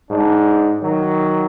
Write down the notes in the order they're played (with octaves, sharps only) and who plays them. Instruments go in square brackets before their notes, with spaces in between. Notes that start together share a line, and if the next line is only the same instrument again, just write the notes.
[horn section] G#2 D4
D#3 F#3